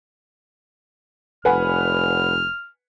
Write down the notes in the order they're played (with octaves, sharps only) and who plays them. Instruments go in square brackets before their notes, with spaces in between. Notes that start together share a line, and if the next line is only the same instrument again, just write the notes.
[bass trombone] F1 [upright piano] B4 F#5 G#5 [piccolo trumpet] F6